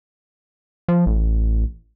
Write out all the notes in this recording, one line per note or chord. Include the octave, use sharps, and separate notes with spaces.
F3
A1